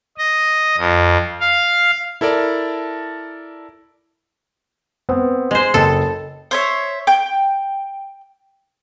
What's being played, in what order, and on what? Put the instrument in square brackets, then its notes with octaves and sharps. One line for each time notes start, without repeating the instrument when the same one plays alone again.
[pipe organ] D#5
F2
F5
[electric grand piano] E4 A4 A#4 D5 A5
[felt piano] B3 C4
[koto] G#3 C5
[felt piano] F#1 D#5 G5 [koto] A4
[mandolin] C5 C#5 E5
G5 G6